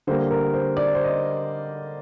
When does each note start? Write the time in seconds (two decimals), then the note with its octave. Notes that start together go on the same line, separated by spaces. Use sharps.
0.07 D3 G3 A#3 C5
0.31 A#4
0.54 C5
0.77 D5
0.95 C5
1.04 D#5